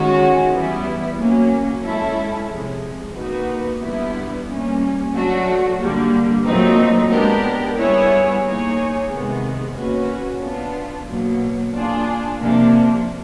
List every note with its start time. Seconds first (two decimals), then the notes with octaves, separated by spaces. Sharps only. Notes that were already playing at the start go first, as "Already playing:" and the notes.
Already playing: D#3 G#3 C#4 F#4
0.51 E3 G3 B3 E4
1.18 F#3 A#3 C#4
1.83 G#3 C#4 E4 A4
2.49 C3 F3 G#3
3.15 A#3 D#4 F#4 B4
3.81 D3 G3 B3 E4
4.47 G3 A#3 C#4
5.13 F#3 A3 D4 F#4
5.79 D3 G3 A#3
6.46 A#2 F#3 A3 C4 D#4
7.11 G#3 B3 D4 G4 A#4
7.77 G3 B3 E4 G#4 C#5
8.43 A#3 D#4 G#4 C#5
9.09 C3 D#3 G#3 B3
9.75 A#3 C#4 F#4 B4
10.42 B3 D4 F4
11.07 B2 F#3 A#3
11.73 A#3 D4 F4 G#4
12.39 C3 F3 A#3 D4